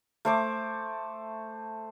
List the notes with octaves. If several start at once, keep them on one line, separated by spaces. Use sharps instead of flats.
A3 C5 D6